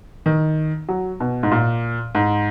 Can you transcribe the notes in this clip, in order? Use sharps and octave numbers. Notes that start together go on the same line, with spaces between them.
D#3
F#3
B2
G#2
A#2
G#2